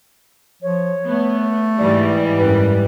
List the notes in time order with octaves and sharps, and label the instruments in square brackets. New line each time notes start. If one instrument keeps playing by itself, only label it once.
[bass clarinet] F3 [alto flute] C#5
[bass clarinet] A3 [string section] B3
[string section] G#2 E3 G3 [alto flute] D5
[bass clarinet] F#2 [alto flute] B4